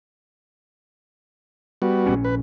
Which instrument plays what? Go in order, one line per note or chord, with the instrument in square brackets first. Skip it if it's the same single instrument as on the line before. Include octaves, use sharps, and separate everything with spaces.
[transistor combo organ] G3 B3 F#4
[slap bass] A#1 C#4
[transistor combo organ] B4